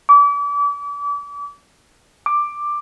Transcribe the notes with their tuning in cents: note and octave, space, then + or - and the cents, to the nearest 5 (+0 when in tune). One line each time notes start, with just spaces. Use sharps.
D6 -35
D6 +10